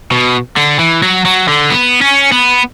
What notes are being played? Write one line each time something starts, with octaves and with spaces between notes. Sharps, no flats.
B2
D3
E3
F#3
F#3
D3
B3
C#4
B3